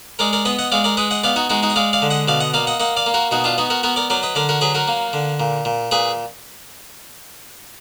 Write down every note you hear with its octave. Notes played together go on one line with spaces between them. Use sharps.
G#3 A#4 D5
A#4 D5
B3 B4 D#5
D#5 F#5
G#3 D5 F5
A#4 D5
G#3 B4 D#5
D#5 F#5
B3 D5 F5
D#4 F#4
G#3 D#4 F#4
D#4 F#4
D#5
G#3 D5 F5
D5 F5
D3
D#5 F#5
B2 D5 F5
D#5 F#5
A#3 D5 F5
D#5 F#5
A#3 D#5 F#5
D5 F5
A#3
F#4 A#4
B2 D#4 F#4
D4 F4
B3 D#4 F#4
F#4 A#4
B3 F#4 A#4
A#4 D5
F#3 A#4 D5
B4 D#5
D3 A#4 D5
F#4 A#4
F#3 G#4 B4
F#4 A#4
A#3
D3
A#2
A#2
A#2 G#4 B4